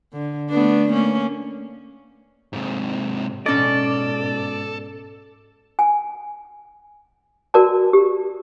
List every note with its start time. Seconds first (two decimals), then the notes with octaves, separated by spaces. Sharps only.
0.13 D3
0.49 A3 B3 D4
0.89 A3 A#3 C#4
2.53 G#2 C3
3.46 G#2 B2 C#4 A4 D5 D#5
5.79 G#5
7.54 F#4 A#4 D5 A5
7.93 G4